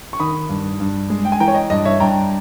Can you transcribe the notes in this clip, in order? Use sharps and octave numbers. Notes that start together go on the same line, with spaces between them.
C#6
D#3 B5 D#6
G2
G2
G#3
G5
G#5
E3 G5 A#5
C#5
D#5
G2 D#5
C#5 E5
G2 G5 A#5